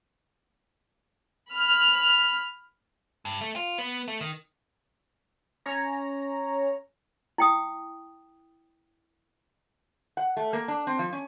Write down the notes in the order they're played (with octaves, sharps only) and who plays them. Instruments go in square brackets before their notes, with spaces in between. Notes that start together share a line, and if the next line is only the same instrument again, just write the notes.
[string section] B5 F6
[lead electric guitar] G2
A3
F4
B3
A3
D#3
[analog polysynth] C#4 C#5 A#5
[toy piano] E4 G5 D#6
[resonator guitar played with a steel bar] F#5
A3
A#3
D4
C4
F3
C#4